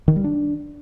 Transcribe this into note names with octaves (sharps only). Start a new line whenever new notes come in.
D#3
G3
D4